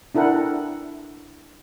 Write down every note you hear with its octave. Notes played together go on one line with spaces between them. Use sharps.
D4 E4 A4 A#4 F#5 G5